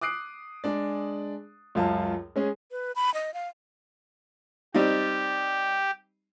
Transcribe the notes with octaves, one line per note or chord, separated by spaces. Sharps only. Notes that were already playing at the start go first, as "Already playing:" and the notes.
D6 D#6 F#6 C7 D7
G#3 D4 D5
C#2 F#2 F4 A5
G#3 C#4 G#4
B4
B5
D#5
F5
G3 C4 D#4 G4